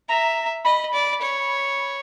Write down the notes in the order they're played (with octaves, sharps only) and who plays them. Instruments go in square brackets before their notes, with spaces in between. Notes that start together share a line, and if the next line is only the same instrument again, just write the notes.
[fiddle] E5 [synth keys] A#5
[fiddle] D#5 [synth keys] B5
[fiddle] D5
C#5